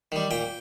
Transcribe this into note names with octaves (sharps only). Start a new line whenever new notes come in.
D#3 G3
A#2 G5